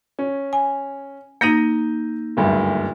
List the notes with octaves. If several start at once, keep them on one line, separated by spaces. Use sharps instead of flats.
C#4
G#5
A#3 D#4 G6 A#6 D#7
F#1 D2 G2